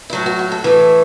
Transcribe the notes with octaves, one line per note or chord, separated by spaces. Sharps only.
E4
A2 F#3 F#4
F#4
F#4
A4
A2 E3